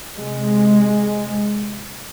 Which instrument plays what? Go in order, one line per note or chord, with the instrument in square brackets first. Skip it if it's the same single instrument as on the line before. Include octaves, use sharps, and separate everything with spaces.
[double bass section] C3 G#3